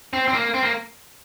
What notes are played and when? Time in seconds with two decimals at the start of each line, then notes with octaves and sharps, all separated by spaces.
0.13 C4
0.28 C4
0.34 A#3
0.54 C4
0.63 A#3